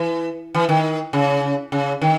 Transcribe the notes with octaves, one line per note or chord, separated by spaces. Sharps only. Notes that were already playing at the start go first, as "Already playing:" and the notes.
Already playing: E3
E3
D#3
C#3
C#3
D#3